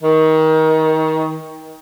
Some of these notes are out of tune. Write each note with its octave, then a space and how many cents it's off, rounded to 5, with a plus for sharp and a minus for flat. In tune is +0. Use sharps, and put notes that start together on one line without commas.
D#3 +25